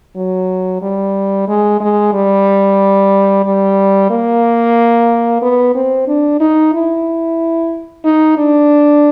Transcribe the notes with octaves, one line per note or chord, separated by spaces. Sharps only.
F#3
G3
G#3
G#3
G3
G3
A#3
B3
C4
D4
D#4
E4
D#4
D4